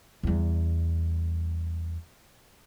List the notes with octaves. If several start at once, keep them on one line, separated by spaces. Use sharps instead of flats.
E2 G3